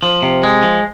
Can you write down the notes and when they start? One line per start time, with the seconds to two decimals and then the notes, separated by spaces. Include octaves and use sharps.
0.03 F3
0.23 C3
0.43 G#3
0.63 F3